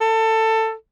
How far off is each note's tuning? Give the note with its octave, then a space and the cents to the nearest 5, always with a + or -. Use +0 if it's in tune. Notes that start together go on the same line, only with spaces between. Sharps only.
A4 +20